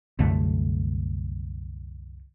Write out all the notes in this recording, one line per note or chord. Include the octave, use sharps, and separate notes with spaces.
C2 F#2 D3 A3